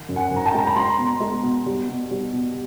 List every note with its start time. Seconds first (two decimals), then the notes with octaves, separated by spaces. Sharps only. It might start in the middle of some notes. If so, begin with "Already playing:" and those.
Already playing: D#3
0.09 F#2
0.16 F#5 G#5
0.31 F#2
0.36 A#5
0.46 G5 A5
0.54 G#3 A#5
0.67 B5
0.76 G#3 A#5 C6
0.99 B2
1.20 G#3
1.43 B2
1.66 G3
1.89 B2
2.11 G3
2.33 B2